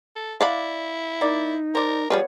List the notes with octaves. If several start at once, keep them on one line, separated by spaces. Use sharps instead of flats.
A4
E4 D5 F5 F#5 B5
A#3 D#4 D5
A#4 C5 D5
F3 G3 B3 G#4 B4 C#5